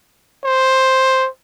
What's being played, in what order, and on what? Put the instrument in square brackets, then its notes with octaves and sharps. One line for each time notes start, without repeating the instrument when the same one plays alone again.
[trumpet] C5